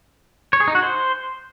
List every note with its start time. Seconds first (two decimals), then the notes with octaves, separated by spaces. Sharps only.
0.53 C#5
0.60 G#4
0.68 D#4
0.75 F#4
0.82 C5